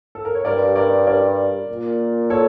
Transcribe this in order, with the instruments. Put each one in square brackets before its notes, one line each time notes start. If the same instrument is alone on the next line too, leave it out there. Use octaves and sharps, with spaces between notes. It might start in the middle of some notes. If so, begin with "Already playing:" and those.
[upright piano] A4
A#4
C#5
[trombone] G2 [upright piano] A#4 D5
[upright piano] A#4 D5
A#4 D5
[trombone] A#2
[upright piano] A4 C#5